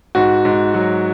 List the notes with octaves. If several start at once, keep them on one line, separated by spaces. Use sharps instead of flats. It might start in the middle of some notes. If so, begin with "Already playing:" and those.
G#2 F#4
G#2
F#3